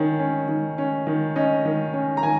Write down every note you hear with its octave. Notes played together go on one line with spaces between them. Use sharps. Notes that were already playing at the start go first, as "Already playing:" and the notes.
Already playing: D#3 C#4
C#4
D#3
C#4
D#3
C#4 D#5
D#3
C#4
A#5
D#3 G#5